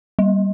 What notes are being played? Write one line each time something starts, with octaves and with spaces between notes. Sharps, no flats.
G3